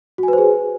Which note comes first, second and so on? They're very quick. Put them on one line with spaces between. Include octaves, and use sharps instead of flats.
F#4 G#5 B4 C5 G#4